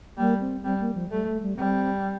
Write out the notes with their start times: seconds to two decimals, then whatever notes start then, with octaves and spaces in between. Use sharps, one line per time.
0.18 G3 A#3
0.40 C4
0.63 G3 C4
0.80 A#3
0.95 F3
1.11 G3 A3
1.27 A3
1.43 G3
1.57 G3 C4